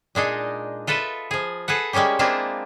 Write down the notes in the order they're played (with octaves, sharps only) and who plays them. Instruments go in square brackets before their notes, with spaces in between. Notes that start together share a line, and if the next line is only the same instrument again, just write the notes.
[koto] A#2 G#3 D4 D#4
F4 A4 B4 D#5 E5
F3 G#4
G#4 A4 B4 F#5
G3 G#3 A#3 C#4 G4
G#3 A#3 C4 D4 E4 F4